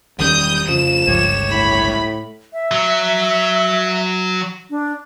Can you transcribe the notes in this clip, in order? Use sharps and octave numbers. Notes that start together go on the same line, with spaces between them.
E1 D#3 G3 C#4 D#6 G6
F2 C#3 F3 E7
G1 C#2 G2 G4 C#5
A2 B5
E5
F#3
D4